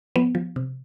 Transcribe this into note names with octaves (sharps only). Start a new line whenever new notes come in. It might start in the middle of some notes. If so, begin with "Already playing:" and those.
F3 B3
F3
C3